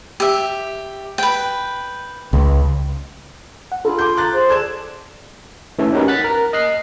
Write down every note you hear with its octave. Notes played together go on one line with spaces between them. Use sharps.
G4 E5
B4 G5
C#2
F#5
D4 F4 G#4 A4 B5
F5 C6 D6 G6
A#5 D6 F#6 A6
G#4 C5 C6
A4 D5 G#6 E7
E3 A3 C#4 A4
C#4 D#4 F#4 G4 A#4 B4
F#5 F#6 A6 B6
A#4
D#5 F#6 C7